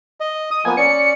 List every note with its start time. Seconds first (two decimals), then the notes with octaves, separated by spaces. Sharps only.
0.20 D#5
0.51 D#6
0.65 F3 A#3 B3 G#5
0.77 C#4 D5 C#7